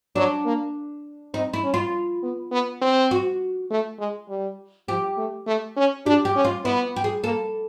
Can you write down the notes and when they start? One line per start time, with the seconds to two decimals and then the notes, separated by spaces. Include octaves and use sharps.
0.16 F#3 D4
0.46 A#3
1.34 C4 D#4
1.53 E4
1.63 C#4
1.74 F4
2.23 B3
2.52 B3
2.81 C4
3.11 F#4
3.70 A3
3.99 G#3
4.29 G3
4.88 F3 G4
5.17 A3
5.47 A3
5.77 C#4
6.06 D4 G4
6.25 G4
6.36 C#4
6.44 F4
6.65 B3 E4
6.96 G4
7.04 G#4
7.24 A#3 A4